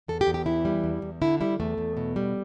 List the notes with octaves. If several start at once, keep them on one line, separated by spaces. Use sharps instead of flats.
E2 A4
G4
E2
G4
E3 E4
G3
E2
E2
D3 E4
G3 E4
E2 A3
E2
B2
G3